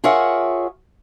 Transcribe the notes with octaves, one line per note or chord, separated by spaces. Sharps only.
F4 G#4 A#4 C#5 E5 F#5